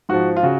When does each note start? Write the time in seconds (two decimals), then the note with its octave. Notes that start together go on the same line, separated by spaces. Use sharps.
0.09 G#2 F3 F#4
0.36 F4
0.43 C#3 F#4